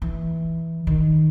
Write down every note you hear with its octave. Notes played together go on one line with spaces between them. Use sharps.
E3
D#3